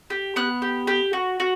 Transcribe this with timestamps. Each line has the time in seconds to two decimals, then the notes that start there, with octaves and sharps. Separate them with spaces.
0.10 G4
0.36 B3 F#6
0.62 G4
0.87 G4
1.13 F#4
1.40 F#4